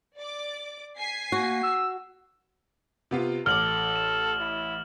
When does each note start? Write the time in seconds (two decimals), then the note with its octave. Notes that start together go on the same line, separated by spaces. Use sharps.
0.16 D5 D6
0.97 G#5 B6 C7
1.32 A#3 F#4
1.63 E6
3.11 C3 B3 F4
3.46 A1 A4 D6 F6 F#7
3.96 E7
4.41 E4